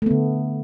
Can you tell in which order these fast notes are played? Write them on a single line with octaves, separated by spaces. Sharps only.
A3 B3 D3